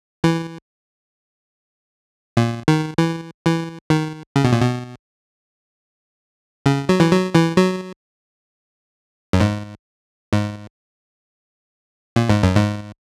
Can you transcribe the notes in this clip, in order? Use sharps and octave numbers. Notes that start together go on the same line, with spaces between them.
E3
A#2
D#3
E3
E3
D#3
C#3
B2
A#2
B2
C#3
F#3
E3
F#3
E3
F#3
F#2
G#2
G#2
A#2
G#2
F#2
G#2